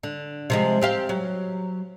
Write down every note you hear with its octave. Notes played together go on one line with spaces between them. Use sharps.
D3
C3 F3 G#3
C4 G4 F5
F#3